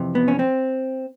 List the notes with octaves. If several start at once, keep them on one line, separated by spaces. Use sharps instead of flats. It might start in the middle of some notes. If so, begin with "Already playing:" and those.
Already playing: F2 C3 E3
B3
C#4
C4